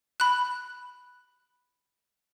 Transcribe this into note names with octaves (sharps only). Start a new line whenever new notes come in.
B5 F#6